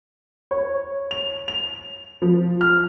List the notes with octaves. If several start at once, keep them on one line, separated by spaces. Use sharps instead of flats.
C#5
F7
F7
F3
F6